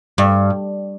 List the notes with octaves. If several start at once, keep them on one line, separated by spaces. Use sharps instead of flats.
G2